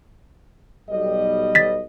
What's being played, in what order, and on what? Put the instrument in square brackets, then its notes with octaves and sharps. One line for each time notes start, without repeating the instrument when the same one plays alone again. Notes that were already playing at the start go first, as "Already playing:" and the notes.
[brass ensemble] B1 G3 D#5
[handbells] A6 B6